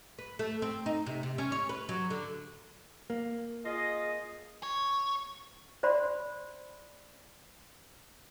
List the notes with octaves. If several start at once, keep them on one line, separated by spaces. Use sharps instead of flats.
B4
A3
C4
D#4
C3
C3
C#4
C#5
B4
F#3
D3
A#3
F4 G#4 D#5
C#5
C5 D5 B5 C6